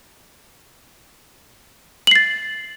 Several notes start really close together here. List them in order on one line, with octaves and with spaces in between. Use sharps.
F#7 C7 A6